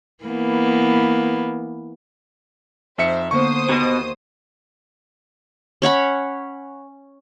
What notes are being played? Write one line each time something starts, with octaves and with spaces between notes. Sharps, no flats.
E3 A#3 B3
F2 D#4 C5 E5 C#7
D3 A#3 B3 C5 C#6 D#6
D#2 B2
C#4 C#5 F#5 B5